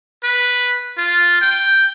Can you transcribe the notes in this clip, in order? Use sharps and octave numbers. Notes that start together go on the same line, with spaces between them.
B4
F4
G5